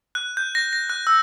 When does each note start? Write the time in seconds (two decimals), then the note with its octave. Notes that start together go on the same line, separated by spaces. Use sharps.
0.15 F#6
0.37 G6
0.55 A#6
0.73 A#6
0.90 F#6
1.07 E6